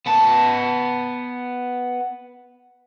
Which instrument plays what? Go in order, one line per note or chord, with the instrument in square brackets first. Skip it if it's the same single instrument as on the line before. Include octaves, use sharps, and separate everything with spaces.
[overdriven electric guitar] B3 A5